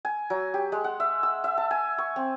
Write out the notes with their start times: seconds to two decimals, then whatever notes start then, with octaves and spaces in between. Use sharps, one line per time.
0.05 G#5
0.30 F#3
0.54 G4
0.72 G#3
0.84 F#5
1.00 E5
1.23 E6
1.44 E5
1.58 A5
1.71 G#5
1.98 C#6
2.16 C4